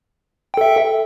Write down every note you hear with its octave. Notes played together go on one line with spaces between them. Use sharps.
A4 E5 G5